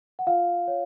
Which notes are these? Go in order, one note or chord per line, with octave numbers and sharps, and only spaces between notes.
F#5
F4 F5
C#5